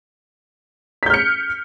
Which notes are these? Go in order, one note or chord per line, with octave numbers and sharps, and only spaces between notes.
F6 G6 B6 C#7